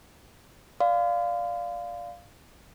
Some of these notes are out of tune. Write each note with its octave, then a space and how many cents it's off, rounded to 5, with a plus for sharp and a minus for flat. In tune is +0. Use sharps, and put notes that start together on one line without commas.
D5 +0 F5 +0 C6 -40